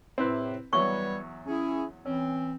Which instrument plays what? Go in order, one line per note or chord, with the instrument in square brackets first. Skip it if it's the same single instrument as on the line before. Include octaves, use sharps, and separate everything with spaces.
[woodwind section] A2 C3 [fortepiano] C4 E4 B4
[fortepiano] E2 F#3 [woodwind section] G3 B4 C#5 [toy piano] C#6
[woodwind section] C#4 E4 G#4
[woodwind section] E3 C4 [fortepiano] C#4